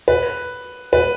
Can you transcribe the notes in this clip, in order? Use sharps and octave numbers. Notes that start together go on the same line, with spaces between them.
B4
B4